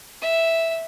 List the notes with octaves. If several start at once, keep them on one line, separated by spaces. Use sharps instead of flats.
E5